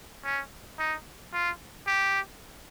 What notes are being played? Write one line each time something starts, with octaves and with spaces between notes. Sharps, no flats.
C#4
D#4
F4
G4